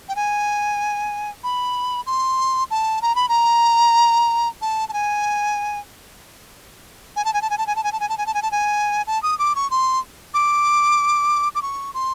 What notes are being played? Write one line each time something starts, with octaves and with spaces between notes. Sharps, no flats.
G5
G#5
B5
C6
A5
A#5
B5
A#5
A5
A5
G#5
G#5
A5
G#5
A5
G#5
A5
G#5
A5
G#5
A5
G#5
A5
G#5
A5
G#5
A5
G#5
A5
D#6
D6
C#6
C6
D6
D6
C#6
C6